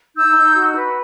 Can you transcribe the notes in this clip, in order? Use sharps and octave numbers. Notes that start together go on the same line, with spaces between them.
D#4 E6 G6
D#4
F#4
B4